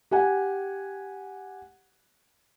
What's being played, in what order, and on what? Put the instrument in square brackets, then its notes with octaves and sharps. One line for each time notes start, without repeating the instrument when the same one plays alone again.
[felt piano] G4 F#5 G#5